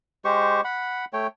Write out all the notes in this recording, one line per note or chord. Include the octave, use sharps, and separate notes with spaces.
G#3 G4 C5 C#6
F#5 B5
A3 C#5 G5